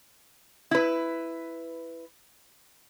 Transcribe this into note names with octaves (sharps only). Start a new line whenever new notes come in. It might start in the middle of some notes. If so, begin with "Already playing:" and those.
E4 B4